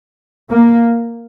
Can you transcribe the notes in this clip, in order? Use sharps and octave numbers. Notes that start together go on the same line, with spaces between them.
A#3